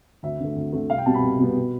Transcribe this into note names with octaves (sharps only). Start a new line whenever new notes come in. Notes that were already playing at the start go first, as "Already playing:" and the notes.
D2 E5
D3 A3
D2
D3 A3
C2 F5
G5
B2 G3 B3 A5
B5
C2
B2 G3 B3
B2